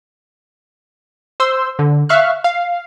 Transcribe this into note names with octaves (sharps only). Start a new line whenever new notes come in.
C5 C6 E6
D3
E5 F5 C#6 F6 F#6
F5